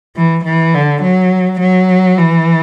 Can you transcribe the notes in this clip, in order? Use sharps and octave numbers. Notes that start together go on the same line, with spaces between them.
E3
E3
D3
F#3
F#3
E3